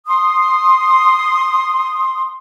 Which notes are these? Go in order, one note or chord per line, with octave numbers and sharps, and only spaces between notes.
C6 D#6